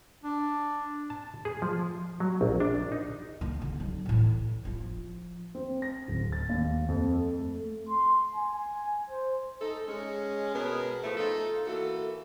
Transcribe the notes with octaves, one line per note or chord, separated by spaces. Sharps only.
D4
A5
G#4
F3
F#3
A#1
D4
D#4
D3 A#3
D3
F#3 D#4
A2 E3
F3 F4
C4
A#6
D1
A6
D#2
F2
A4
A3
C6
G#5
C5
D#4 A4
G#3 C#4
B2 B3 G#4 A#4
A2 F3 A3
D#4 F4 A4
E3 A#3 F#4 A4